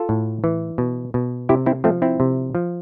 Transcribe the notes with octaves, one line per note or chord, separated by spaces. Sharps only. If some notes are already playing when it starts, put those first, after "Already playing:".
Already playing: F4 A4
A2
E3
B2
B2
C3 E4 G4
C4 E4
F3 A3 C4
C4 E4
C3
F3